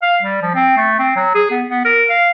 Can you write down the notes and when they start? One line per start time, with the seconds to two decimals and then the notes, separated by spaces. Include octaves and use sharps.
0.02 F5
0.23 G3
0.42 F3
0.55 C4
0.77 A3
0.99 C4
1.16 F#3
1.35 G#4
1.51 B3
1.68 B3
1.85 A#4
2.10 F5